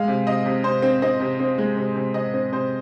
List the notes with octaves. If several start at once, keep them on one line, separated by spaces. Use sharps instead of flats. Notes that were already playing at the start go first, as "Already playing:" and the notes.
Already playing: G#3 F5
C3
C3 D#5
C3
C3 C5
C4
C4 D#5
C3
C4
G#3
C3
C3
C3 D#5
C4
C3 C5